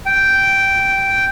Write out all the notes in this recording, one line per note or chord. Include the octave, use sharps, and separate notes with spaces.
G5